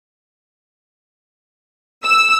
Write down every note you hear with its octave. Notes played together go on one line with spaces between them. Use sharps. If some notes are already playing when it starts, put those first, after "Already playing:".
E6